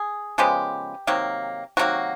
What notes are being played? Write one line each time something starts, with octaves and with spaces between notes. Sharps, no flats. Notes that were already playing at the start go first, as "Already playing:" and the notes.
Already playing: G#4
C#3 F3 G#3 B3 G4
C3 D#3 F#3 A#3
C3 D#3 F#3 A#3 F#4